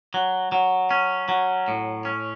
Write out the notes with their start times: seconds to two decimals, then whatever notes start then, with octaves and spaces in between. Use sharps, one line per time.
0.14 F#3
0.52 F#3
0.91 C#4
1.29 F#3
1.68 A2
2.05 C#4